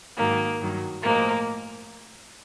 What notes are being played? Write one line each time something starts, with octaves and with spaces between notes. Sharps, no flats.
G#2 D#3 F#3 A#3
G2 D#3 F#3
A2 F3 G#3 A#3